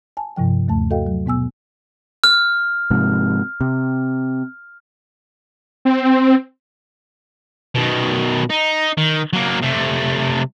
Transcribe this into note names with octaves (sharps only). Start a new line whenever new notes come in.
G#5 A5
G2 C3 F3 G5
D#2 A3 A5
F#4 A4 D#5 F5 G5
F#3
B2 B3 G#5 E6
F6
G#2 C3 F3
C3
C4
B2 D#3
D#4
D#3
F#3 A#3
C3 A3